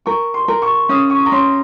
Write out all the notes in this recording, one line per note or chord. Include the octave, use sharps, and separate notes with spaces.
A#4 C#6
C6
A#4
C#6
C#4 D#6
C#6
A#5
C#4 C6